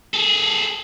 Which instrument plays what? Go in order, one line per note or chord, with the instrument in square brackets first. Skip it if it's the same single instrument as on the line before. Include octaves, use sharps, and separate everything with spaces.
[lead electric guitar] G#4 A4